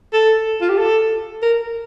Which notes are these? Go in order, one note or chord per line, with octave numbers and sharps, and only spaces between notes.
A4
F4
G4
A4
A#4